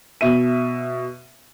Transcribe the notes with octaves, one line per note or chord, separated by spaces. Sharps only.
B2 E5 D#7